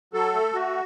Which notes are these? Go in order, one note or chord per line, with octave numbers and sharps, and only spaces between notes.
F#3 A4
A3
A3 F#4